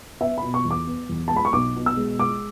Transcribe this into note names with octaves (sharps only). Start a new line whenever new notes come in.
B3 E5
B5
B2
C#6
E2
D6
B3
E2
G#3 A5
B5
C#6
B1 D6
B2
E6
G#3
G#3 D6